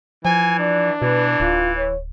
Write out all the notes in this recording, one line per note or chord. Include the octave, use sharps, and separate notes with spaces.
E3 F3 G#5
D4 D5
B2 E3 B4
D1 F4
C#5